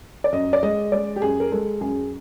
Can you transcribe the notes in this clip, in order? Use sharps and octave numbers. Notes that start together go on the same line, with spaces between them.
D5
F#2 D#5
D5
G#3 D#5
G#3 D5
G4
F#2 G#4
A#4
G#3 A4
F#2 G#4